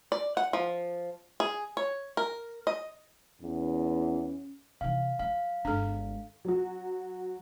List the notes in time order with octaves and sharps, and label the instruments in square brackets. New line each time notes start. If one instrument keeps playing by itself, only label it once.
[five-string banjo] D5
F#5
F3
G#4
C#5
A#4
D#5
[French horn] E2 [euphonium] C#4
[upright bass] C3 E3 [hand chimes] F5
[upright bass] F3 F#3 [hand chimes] F5
[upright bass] G1 G#3 [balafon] D4 A4
[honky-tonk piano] F#3 F#4